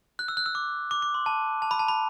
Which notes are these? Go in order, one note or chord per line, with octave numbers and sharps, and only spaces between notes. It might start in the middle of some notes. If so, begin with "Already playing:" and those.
F#6
E6
F#6
E6
D6
D6
D6
C6
A5
A5
B5
A5
B5